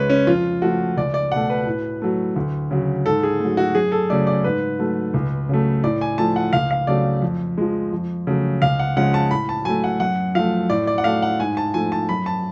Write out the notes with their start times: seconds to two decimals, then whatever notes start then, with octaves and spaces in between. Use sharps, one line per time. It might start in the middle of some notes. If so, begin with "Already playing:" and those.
Already playing: C#2 C#3 G#3 B4 C#5
0.10 C#4
0.27 F2 F4
0.62 F3 A3 F#4
0.97 C#2 D5
1.14 D5
1.31 B2 A3 F#5
1.50 B4
1.67 A2
2.02 F#3 A3
2.36 D2
2.71 C#3 F#3
3.06 G#2 A4
3.23 G#4
3.40 F#3 A3
3.57 F#4
3.75 F#2 G#4
3.92 A4
4.10 C#3 F#3 A3 D5
4.27 D5
4.44 G#2 B4
4.79 F#3 A3
5.14 C#2
5.49 C#3 F#3 A3
5.84 A2 D5
6.01 G#5
6.18 F3 A3 A5
6.36 F#5
6.53 C#2 F5
6.71 F5
6.87 C#3 F#3 A3 D5
7.22 F2
7.58 F3 G#3
7.93 F2
8.27 C#3 F#3 A3
8.62 C#2 F5
8.79 F#5
8.96 C#3 F3 G#3 F#5
9.14 A5
9.31 A2 B5
9.49 A5
9.65 F#3 A3 G#5
9.84 F#5
10.00 F#2 F#5
10.35 F3 A3 F5
10.70 A2 D5
10.87 D5
10.98 F#5
11.04 F#3 A3 F5
11.22 F#5
11.40 G#2 G#5
11.57 A5
11.74 F3 A3 G#5
11.92 A5
12.09 F#2 B5
12.26 A5